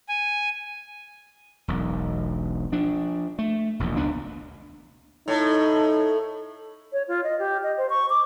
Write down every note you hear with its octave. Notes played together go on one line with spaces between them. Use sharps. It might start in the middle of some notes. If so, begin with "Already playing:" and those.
G#5
E1 B1
F3 D4
A3
E1 A#1 D#2
C#2 B3 D4
A2 D#4
C#5
F4
D#5
G4
D#5
C5
C#6
D6